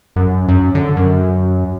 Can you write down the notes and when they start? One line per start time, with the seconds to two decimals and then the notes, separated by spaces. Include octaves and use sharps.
0.16 F#2
0.48 F#2
0.75 D3
0.96 F#2